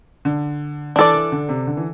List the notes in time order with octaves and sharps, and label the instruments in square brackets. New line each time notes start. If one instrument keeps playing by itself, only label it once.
[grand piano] D3
[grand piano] E3 [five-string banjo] D4 A4 D5
[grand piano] E3
D3
C3
D3
E3